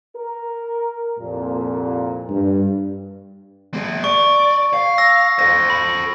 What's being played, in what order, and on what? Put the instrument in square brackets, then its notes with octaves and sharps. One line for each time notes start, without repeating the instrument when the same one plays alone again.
[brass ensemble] A#4
C2 F2 A#2
[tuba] G2
[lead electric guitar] A#3 G#4
[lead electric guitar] D5 [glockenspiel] C#6
[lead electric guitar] F5
[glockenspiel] E6 A#6
[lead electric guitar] A4 C5 [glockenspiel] A#6
[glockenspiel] B5